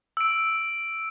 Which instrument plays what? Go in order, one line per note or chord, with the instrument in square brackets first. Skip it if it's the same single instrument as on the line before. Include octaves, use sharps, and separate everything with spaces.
[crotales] E6 D7